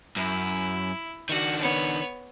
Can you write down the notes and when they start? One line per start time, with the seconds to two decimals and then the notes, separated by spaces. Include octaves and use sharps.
0.16 F#2 E4
1.29 D#3 D4 F#4 F#5
1.59 B3 C#5